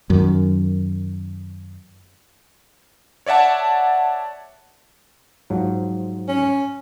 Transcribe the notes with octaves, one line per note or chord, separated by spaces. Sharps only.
F#2 D#3
C#5 D5 E5 F#5 A5
G#2 F3 F#3
C#4